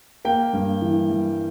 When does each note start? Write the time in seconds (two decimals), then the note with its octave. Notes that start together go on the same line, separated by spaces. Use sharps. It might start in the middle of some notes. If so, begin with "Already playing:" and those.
0.25 A#3 G5
0.53 G2
0.82 E3
1.10 G3